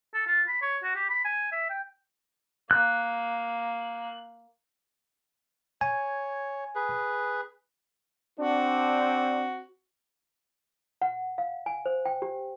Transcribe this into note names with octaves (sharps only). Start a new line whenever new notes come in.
A4
F4
B5
C#5
F#4
G4
B5
G#5
E5
G5
A#3 F#6
C#5 G#5
G#4 B4
C4 D4 F#4
F#5
F5
G#5
C5
G5
G4